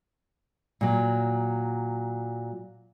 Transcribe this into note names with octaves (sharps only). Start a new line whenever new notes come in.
A#2 F#3